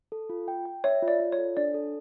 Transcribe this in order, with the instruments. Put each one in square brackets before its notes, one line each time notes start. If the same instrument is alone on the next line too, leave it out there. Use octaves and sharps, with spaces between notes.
[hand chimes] A4
F4
G5
G5
[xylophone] C#5 [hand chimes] E5
[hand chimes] F4
[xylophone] D5
[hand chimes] F4
[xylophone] C#5
[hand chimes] A4
[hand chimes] D4 [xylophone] D5
[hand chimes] A4